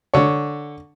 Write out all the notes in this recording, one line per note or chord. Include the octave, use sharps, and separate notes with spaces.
D3 C#5